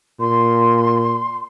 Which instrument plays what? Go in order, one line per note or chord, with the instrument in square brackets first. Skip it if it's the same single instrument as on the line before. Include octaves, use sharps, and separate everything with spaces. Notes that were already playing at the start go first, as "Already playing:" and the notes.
[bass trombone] A#2 [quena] C6